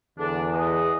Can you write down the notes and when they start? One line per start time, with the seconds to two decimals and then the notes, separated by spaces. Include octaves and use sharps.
0.19 E2 D3 D4
0.54 G#4 B4 D#5